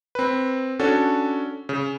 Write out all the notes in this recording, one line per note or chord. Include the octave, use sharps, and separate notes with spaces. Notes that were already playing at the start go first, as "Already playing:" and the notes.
C4 B4
C#4 D4 F#4 A4
C#3